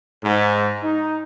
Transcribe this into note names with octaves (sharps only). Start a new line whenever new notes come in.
G#2
D#4